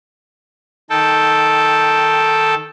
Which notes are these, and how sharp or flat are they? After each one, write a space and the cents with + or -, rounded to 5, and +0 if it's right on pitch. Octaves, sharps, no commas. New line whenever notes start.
D#3 +0 A4 +0 G5 +0